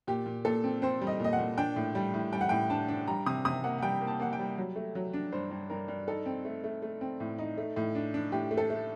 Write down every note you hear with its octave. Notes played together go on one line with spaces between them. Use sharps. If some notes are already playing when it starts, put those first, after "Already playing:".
A#2 G4
A#2
A#2 A4
C4
C4 C5
G3
D#5
A#2 D#5
F#5
A#2
D4 G5
A2
G3
A2
G3 G5
F#5
A2 G5
D4 A5
D4
G3 A#5
C3 D#6
C3 D#6
A#3 F#5
F#5
G3 G5
A#3
A5
A#3 F#5
G5
G3
F#3
A3
F#3
D4
G2 C5
G2
G2 A#4
G2
D#4 A4
C4
A3
A3
A3
C4
A2
D#4
A3
A2
D4
D4
A2 G4
A3
A4
A3